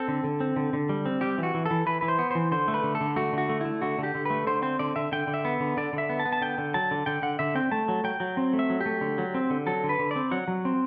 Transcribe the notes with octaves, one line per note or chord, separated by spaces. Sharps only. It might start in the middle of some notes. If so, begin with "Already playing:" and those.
Already playing: C4 A4
D3
D3
C4
D3
D3
G3
C4
G3 G4
E3 F#4
E3
A4
E3
E3 B4
E3 B4
C5
B3
E3 C5
D3 C5
A3
B4
D3
A4
D3
A3 F#4
D3 F#4
A3
A3 E4
D3 F#4
D3 G4
D3
A3 B4
D3 C5
C4 C5
D3 D5
D3 E5
D3 G5
D3
E5
B3
D3
D3 D5
D3 E5
B3
A5
B3
A5
D3 G5
D3
F#3 A5
D3
D3 G5
D3 F#5
D3 E5
C4 G5
A3 A5
F#3
F#3 G5
F#3
C4
A3
E5
F#3
G4
A3
D3
F#3
C4
D3
F#3 A4
D3
B4
D3
C4 D5
F#3 F#5
F#3
C4